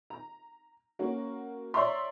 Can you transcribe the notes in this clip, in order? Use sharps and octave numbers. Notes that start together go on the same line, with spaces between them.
A#5
A#3 C#4 F#4 A#4
C#5 D5 E5 A#5 C6